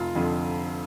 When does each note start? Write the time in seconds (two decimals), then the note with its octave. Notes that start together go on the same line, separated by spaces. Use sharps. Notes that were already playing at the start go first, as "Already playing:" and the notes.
Already playing: F1 F4
0.15 F2 D3 F3